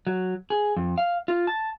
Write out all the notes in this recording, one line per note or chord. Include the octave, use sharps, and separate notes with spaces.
F#3
G#4
F2
F5
F4
A5